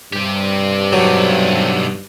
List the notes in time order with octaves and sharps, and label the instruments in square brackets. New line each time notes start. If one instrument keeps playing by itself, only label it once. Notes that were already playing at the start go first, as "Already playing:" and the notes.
[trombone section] G2 [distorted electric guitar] C4 G4
[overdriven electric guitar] B1 D3 [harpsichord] F#3